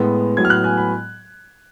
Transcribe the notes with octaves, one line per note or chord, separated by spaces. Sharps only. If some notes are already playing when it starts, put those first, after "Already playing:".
Already playing: A2 G#3 B3
A2 F#3 B3 G#6
F6
F#6
G#5
B5